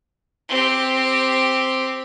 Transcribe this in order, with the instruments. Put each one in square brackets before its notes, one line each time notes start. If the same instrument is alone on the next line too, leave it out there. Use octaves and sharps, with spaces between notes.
[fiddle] C4 G4